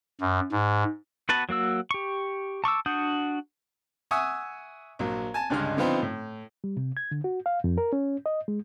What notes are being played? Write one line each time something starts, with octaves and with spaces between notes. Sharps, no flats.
F#2
G#2
B3 F#4 B4 A5
F#3 A#3 F#4 E6
G4 C#6
A5 C#6 D6 E6
D4 F#4 F#5 D#6 G6
E5 F#5 G#5 C#6 D#6 E6
A#1 F#3
G#5 A5
C#2 G2 D3 G#3 F6
D3 F3 B3 C4 D#4
A2
G3
C3
G#6
D3
F#4
F5
F2
A#4
C#4
D#5
G#3